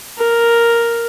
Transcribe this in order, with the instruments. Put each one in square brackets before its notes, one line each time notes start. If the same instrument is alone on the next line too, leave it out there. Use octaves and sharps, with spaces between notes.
[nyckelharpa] A#4